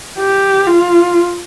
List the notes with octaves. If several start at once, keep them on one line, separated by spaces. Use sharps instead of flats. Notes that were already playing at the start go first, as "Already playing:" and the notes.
G4
F4